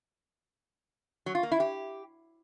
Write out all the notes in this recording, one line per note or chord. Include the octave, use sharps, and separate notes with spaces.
F#3
F4
A#3
E4
G4